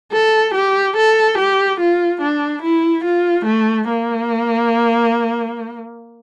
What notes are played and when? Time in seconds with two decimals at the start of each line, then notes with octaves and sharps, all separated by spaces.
0.12 A4
0.54 G4
0.97 A4
1.38 G4
1.80 F4
2.21 D4
2.63 E4
3.04 F4
3.45 A3
3.88 A#3